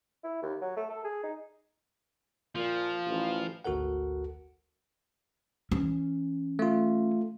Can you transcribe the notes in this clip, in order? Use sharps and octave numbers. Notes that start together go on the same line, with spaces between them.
E4
D#2
F#3
A3
A4
G#4
D#4
A#2 F3
A1
G#1 D2 F#4 A4 A#4 F#5
E3 C#4
A3 F4